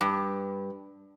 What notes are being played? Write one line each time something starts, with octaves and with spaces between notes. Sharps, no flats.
G2